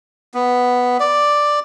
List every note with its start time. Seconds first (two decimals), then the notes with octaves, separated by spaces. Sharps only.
0.34 B3
1.00 D5